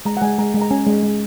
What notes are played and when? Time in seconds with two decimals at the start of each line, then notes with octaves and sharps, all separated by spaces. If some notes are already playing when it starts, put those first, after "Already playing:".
0.05 G#3 A#5
0.17 F#5
0.22 G#3 G#5
0.38 G#3 A#5
0.54 G#3
0.61 A#5
0.71 C#4 G#5
0.87 G#3
1.03 G#3